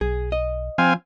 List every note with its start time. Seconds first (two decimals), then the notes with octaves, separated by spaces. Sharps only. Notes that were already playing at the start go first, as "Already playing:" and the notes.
0.01 B1 G#4
0.32 D#5
0.78 F3 C4 F5 G#5